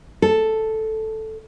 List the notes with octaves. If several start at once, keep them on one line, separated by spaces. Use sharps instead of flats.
A4